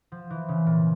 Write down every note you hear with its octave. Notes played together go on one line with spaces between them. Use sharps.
F3
E3
C#3
A#2